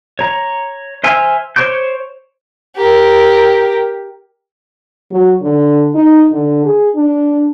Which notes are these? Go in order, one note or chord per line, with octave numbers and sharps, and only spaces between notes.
C#5 A#5
C5 E5 G#5 E6 F6
C5 C#5 C#6 D6 G6
G4 A#4
F#3
D3
D#4
D3
G#4
D4